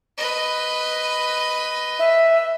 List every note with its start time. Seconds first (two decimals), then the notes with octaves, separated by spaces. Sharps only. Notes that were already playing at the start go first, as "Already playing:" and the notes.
0.17 B4 D#5
1.99 E5